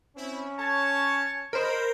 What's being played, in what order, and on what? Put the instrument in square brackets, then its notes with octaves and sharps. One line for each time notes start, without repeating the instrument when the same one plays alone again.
[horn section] C4 E4 [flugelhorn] C#4
[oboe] C#5 [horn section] A5
[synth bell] A#4 C5 [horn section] D#5 B5